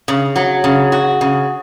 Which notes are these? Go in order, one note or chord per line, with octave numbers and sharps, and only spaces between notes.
C#3
F#3
C#3
F#4
C#3